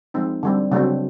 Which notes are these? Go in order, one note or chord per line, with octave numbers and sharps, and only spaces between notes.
F3 G#3 C4 D#4
D3 G3 C4
C#3 F#3 A3 C4 D4